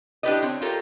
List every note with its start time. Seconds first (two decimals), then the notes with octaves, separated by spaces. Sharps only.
0.23 D4 E4 G4 B4 D5 D#5
0.42 C4 C#5
0.61 F4 G4 A4 A#4 C#5